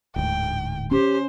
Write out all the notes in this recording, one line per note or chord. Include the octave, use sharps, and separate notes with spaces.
D1 D2 G#2 G5
C#4 G4 C5